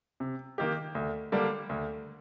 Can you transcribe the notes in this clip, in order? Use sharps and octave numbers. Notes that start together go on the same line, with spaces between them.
C3
D#3 A#3 D#4 G4
D2
D3 G3 A#3 D4
D2